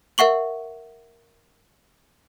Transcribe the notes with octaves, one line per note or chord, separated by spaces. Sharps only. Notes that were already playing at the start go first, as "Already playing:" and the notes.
A#4 E5 F#5 C#6 F#7